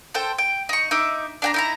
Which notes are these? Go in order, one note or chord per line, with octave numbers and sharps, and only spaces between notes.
A4 C5 G5
G5
D#4 C#6
D#4 E5 D6
D4 G5 A#5
D#4 E4 A#5